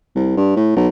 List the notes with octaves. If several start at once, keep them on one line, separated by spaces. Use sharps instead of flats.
C2
G2
A2
B1